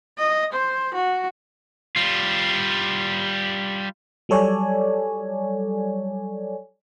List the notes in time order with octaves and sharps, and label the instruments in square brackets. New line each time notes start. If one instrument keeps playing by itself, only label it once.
[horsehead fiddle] D#5
C5
F#4
[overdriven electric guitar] G3 F4
[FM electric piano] F#3 G3 A4 C#5 D5 G#5